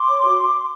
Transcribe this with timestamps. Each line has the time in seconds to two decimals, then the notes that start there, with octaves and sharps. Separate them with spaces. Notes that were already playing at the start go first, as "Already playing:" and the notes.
Already playing: C6 D6
0.09 C#5
0.24 F#4